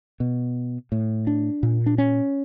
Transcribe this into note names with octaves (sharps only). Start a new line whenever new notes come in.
B2
A2
D4
A#2
D4
C#4